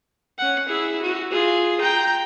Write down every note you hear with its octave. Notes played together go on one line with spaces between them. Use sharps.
C#4 F#5
E4 G#4
F#4
F4 G#4
G5 A#5